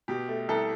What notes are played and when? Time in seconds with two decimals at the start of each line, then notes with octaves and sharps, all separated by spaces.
0.08 B2 G4
0.28 A3
0.48 C2 A4